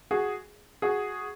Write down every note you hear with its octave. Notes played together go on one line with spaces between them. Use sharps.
F#4 G#4
F#4 G#4